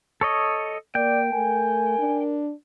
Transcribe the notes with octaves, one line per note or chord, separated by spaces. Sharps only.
A4 C#5 D#5
A#3 D5 G5
A3 A#4 G#5
D4